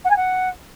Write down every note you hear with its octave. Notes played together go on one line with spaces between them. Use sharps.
F#5
G#5
F#5